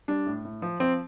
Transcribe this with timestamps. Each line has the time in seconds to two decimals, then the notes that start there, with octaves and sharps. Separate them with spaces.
0.08 G3 D4
0.26 A2
0.45 A2
0.62 F3
0.80 F3 C4